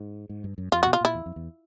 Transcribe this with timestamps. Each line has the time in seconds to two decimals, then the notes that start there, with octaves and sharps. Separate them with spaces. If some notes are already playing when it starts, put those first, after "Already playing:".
Already playing: G#2
0.29 G#2
0.44 G2
0.58 F#2
0.72 F2 F4
0.83 B2 F#4
0.93 F4
1.01 A#2 E4
1.14 E2
1.26 F2
1.36 E2